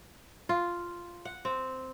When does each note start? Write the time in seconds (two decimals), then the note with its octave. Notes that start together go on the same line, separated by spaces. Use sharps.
0.49 F4
1.25 F#5
1.45 C4